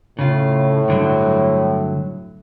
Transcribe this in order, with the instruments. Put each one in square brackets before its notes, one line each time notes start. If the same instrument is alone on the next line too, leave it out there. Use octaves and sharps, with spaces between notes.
[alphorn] A2 [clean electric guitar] C#3 F4
[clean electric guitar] G2 D3 F#3